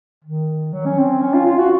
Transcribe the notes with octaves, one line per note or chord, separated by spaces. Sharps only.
D#3
F#3
C#4
C4
C#4
F4
F4
F#4